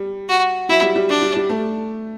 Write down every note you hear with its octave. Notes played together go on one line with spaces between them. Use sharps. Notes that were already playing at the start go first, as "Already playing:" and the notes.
Already playing: G3
F#4
F#3 E4
G3
G3
D4
G3
G3
A3